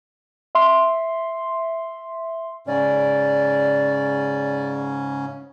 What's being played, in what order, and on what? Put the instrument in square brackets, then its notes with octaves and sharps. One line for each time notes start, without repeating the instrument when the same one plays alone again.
[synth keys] E5 C6
[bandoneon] G#2 C#3 C#4 [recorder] D5